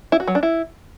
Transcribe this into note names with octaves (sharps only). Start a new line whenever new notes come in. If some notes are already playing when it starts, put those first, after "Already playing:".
E4
F#4
F#3
D4
E4